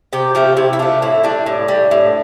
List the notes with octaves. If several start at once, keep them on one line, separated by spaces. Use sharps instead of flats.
C3 G4
F3 A3 G4
C3 E4
E4
F3 A3 D4
A2 E4
G3 D4
A2
G3
A2